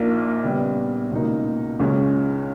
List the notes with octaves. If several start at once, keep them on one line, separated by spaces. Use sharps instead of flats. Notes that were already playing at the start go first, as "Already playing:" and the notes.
Already playing: A#1 A#2 A#3 D#4
C#3 G3 B3
C#2 B2 A#3 D#4
C#2 C#3 G#3 C#4